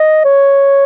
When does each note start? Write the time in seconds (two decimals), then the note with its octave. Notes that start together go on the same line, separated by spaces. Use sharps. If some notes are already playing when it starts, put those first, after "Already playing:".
Already playing: D#5
0.25 C#5